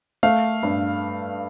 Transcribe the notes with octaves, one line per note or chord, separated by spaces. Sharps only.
A3 F5
G2